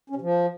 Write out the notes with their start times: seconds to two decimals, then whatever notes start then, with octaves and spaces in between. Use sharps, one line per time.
0.10 C#4
0.16 C3
0.22 F3